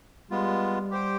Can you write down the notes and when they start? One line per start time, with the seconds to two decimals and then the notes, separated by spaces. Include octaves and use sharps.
0.31 G3 G#3 B3 F4
0.91 G4 C5 G5